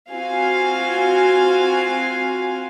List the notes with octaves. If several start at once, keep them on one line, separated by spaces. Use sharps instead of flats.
C4 F4 F#4 F5 G#5